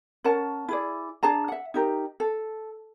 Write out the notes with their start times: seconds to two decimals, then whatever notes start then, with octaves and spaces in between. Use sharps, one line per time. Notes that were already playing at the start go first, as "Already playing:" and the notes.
0.24 C#4 A#4 F#5 A5
0.69 E4 G#4 D5
1.23 D4 G#4 A5 A#5
1.48 E5 F#5
1.74 D#4 G4 A#4
2.20 A4